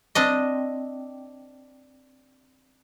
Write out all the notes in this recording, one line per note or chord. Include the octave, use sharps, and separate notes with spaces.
C4 D4 D#5